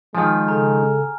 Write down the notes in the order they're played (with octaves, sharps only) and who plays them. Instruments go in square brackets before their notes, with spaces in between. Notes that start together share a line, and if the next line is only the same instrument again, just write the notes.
[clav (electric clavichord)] D#3 F3 [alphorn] G#3 [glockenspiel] G#5 F6
[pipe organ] C#3 A4 [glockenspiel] A#5